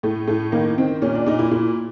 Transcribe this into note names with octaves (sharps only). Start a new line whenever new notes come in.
A2 A3
A2 A3
D#3 A#3
D#3 C4
A#2 C#4
D4
A#2 D#4
E4
A#2 E4